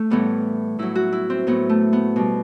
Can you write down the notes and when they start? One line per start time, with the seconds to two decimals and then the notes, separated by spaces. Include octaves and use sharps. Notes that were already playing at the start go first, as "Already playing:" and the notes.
Already playing: A3
0.10 A2 E3 G3 B3
0.79 A2 F#3 E4
0.95 F#4
1.13 E4
1.30 C4
1.47 A2 F#3 B3
1.69 A3
1.93 B3
2.16 B2 G3